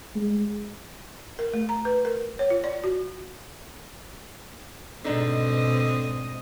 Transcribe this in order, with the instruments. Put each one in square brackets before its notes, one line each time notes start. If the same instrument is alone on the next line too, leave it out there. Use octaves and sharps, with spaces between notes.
[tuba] G#3
[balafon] A#4
A3
A#5
B4
A#4
C#5
F4
D5
F#4
[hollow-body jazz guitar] G#2 D4 D#4 [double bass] B2 [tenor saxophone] D3 [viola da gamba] C4 D#5